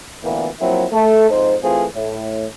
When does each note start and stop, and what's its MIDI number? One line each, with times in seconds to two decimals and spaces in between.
0.23 0.47 33
0.23 0.47 38
0.23 0.47 46
0.23 0.47 52
0.23 0.47 58
0.23 0.47 59
0.60 0.85 53
0.60 0.85 54
0.60 0.85 58
0.60 0.85 60
0.60 0.85 64
0.92 1.28 57
0.92 1.28 69
1.30 1.56 41
1.30 1.56 44
1.30 1.56 63
1.30 1.56 72
1.63 1.86 52
1.63 1.86 57
1.63 1.86 60
1.63 1.86 65
1.63 1.86 68
1.63 1.86 72
1.94 2.46 45